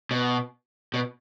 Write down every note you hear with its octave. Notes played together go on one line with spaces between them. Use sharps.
B2
B2